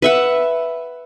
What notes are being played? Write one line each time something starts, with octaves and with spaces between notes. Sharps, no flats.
B4 E5 F#5